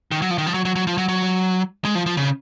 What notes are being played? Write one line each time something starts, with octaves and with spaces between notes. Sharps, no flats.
D#3
F#3
F3
D#3
F3
F#3
F#3
F#3
F3
F#3
F#3
G#3
F3
F3
C#3